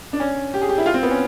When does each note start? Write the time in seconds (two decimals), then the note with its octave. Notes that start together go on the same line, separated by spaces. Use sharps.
0.13 D4
0.20 C#4
0.54 G4
0.62 G#4
0.69 G4
0.78 E4
0.86 F4
0.94 C4
1.03 B3
1.11 C#4